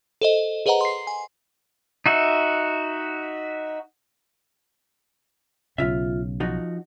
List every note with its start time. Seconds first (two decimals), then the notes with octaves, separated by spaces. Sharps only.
0.21 A4 C5 D#5
0.66 G#4 B4 C5 D#5 F#5 A#5
0.81 C6 C7
1.07 G#5
2.06 D#4 F#4 E5
5.78 B1 C#3 F4 E5
6.40 F3 D#4 F#4